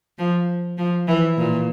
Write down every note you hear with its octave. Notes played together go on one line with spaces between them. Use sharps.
F3
F3
E3
A#2